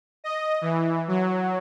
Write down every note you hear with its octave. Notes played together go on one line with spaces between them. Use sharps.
D#5
E3
F#3